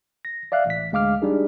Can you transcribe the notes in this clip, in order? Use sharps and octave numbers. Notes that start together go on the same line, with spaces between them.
A#6
D5 E5 F5 F#6
A1 B6
D2 G#3 F5 D6 F6
G3 D4 D#4 G#4